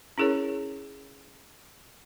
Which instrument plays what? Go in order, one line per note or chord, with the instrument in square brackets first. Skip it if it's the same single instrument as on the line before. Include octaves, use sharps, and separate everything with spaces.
[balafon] C#4 E4 G#4 A#4 C#5